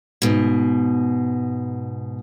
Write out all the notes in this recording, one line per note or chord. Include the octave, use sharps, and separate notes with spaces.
G#2 B2